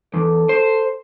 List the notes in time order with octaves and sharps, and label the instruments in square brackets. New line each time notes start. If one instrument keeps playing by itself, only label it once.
[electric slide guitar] E2 [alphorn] A4
[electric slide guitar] C5